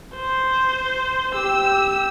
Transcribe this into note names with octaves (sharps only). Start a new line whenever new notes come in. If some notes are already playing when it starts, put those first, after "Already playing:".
C5
G4 E6